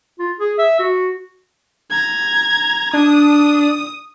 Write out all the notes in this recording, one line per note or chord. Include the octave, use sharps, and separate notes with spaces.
F4
G#4
E5
F#4
A#5 G#6
D4 D#6